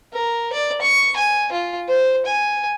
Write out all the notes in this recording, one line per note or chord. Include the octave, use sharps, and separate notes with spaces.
A#4
D5
C#6
G#5
F4
C5
G#5